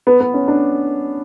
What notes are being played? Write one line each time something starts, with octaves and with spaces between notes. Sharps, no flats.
B3
B3
C#4
D4